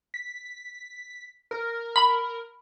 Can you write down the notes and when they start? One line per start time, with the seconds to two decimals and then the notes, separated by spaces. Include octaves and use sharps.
0.14 B6
1.51 A#4
1.96 B5